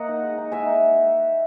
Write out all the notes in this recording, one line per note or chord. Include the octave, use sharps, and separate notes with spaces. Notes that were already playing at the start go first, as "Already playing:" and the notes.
Already playing: A#3 D#5 F#5
D#4
G#3
D#4
G#3 E5 G#5
D#4